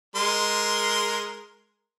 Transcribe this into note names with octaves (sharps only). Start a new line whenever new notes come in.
G#3 A#4 C6